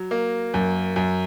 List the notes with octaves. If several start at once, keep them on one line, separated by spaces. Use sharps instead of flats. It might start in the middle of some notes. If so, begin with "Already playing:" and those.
Already playing: F#3
A#3
F#2
F#2